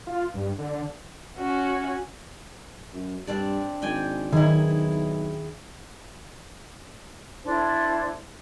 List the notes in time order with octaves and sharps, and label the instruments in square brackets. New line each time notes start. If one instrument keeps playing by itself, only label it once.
[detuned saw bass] F4
G2
D3
[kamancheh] C#4 F#4
[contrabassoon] F#2
[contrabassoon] G2 [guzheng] C4 D4 D5
[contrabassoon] G#1 [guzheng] D5 G5 G#5
[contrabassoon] B1 [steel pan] D#3 [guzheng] E4 G#4
[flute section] D4 E4 A4 C5